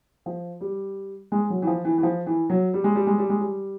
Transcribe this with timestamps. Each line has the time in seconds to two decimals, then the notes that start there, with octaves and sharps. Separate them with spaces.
0.26 F3
0.61 G3
1.32 G#3
1.50 F#3
1.62 E3
1.67 F3
1.85 E3
1.98 E3
2.03 F3
2.26 E3
2.50 F#3
2.74 G3
2.84 G#3
2.95 G3
3.07 G#3
3.18 G3
3.30 G#3
3.40 G3